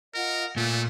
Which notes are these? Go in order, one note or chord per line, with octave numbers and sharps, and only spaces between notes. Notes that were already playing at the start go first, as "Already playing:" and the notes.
F4 A#4 D#5 F#5
A#2 A3 F4